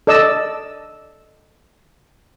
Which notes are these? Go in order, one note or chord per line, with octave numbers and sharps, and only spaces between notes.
A4 D5 D#5 E6